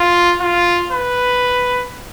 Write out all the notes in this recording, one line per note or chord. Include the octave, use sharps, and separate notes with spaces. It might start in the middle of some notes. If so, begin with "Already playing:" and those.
Already playing: F4
F4
B4